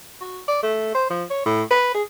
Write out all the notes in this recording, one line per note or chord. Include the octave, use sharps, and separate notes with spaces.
F#4
D5
A3
C5
F3
C#5
A2
B4
G#4